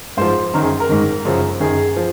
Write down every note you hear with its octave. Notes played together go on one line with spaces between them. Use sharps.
G#2 F3 C5
F#2 D#3 A#4
G#4
A#4
G#2 D#3
F#2 C#3 F3
F#2 D#3 G#4
F3